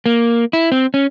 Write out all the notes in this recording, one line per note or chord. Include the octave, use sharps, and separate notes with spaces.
A#3
E4
C4
C#4